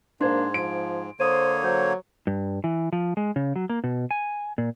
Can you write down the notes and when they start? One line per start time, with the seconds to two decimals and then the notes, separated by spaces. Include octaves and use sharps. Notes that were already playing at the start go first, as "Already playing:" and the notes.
0.21 G#2 A#3 D4 C5 C6 G#6
0.54 F3 D7
1.20 D3 A#3 C5 C#5 D#6 D#7
1.64 F#3 C5 G6
2.27 G2
2.64 E3
2.93 F3
3.17 G#3
3.36 C#3
3.56 F#3
3.69 A#3
3.84 B2
4.11 G#5
4.58 A#2